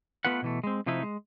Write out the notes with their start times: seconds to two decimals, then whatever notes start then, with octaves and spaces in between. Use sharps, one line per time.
0.25 A3 B3 F4 B4 F#5
0.42 B2 E3 A3
0.64 G#3 C4
0.86 C3 F3 A3 D#4 E4
1.03 G#3